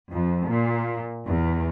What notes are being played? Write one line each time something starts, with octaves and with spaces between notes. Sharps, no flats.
F2
A#2
E2